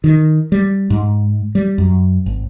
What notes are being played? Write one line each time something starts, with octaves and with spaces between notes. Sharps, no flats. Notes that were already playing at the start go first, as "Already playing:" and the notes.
D#3
G3
G#2
G3
F#2
G#1